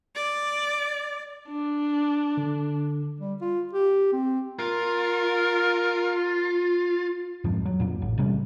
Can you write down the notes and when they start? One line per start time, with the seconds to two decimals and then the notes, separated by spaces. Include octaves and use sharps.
0.15 D5
1.49 D4
2.37 D3
3.21 G3
3.41 F4
3.73 G4
4.12 C4
4.59 F4 A#4
7.44 D1 F2 G#2 F3
7.65 F#3
7.80 F2 A#2
8.02 A1
8.18 A1 C3 G3 C#4